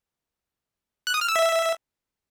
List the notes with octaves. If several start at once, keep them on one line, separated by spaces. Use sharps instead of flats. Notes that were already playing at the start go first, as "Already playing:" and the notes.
F#6
D#6
F6
E6
E5